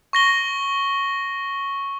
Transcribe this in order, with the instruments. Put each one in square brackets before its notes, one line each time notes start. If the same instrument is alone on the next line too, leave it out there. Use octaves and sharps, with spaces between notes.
[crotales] C#6 A#6 G7